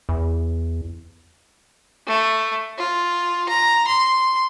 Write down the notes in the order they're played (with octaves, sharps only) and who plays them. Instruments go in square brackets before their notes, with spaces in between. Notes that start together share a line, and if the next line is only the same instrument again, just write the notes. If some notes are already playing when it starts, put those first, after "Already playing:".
[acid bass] E2
[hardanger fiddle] A3
F4
A#5
C6